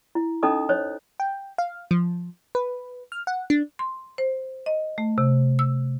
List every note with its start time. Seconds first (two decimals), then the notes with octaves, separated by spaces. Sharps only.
0.15 E4
0.43 C#4 D#4 A4 D#5 A#5 D#6
0.69 C5 C#5 D#5
1.20 G5
1.58 F5
1.91 F3
2.55 B4
3.12 F6
3.27 F#5
3.50 D4
3.79 C6
4.18 C5
4.66 D#5
4.98 A3
5.18 C3
5.59 E6